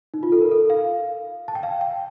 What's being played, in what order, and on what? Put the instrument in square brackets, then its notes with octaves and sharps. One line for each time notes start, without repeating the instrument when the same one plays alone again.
[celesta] D#4
F4
A4
A#4
A4
F5
A5
G5
F5
G5